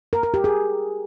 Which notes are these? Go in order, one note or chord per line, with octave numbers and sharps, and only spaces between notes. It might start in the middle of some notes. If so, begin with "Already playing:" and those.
A#4
A#4
G4
G#4